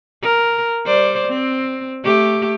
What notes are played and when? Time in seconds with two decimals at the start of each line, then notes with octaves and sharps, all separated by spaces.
0.22 A#4
0.86 G3 C5 D5
1.27 C4
2.04 A3 G4